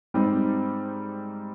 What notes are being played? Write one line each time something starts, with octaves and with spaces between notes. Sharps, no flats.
G#2 G3 C4 D#4